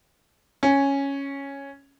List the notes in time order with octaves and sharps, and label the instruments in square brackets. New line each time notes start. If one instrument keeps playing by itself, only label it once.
[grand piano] C#4